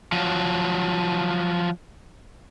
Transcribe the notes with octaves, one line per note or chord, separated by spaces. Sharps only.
F3 F#3